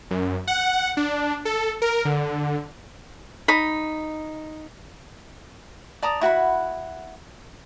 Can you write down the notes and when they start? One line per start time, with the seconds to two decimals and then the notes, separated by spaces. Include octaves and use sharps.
0.11 F#2
0.47 F#5
0.97 D4
1.45 A4
1.82 A#4
2.05 D3
3.48 D#4 B5
6.03 D5 A5 A#5 D#6
6.21 E4 F#4 F#5 B5